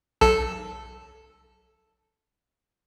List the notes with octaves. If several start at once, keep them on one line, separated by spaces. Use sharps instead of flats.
B1 A4 A5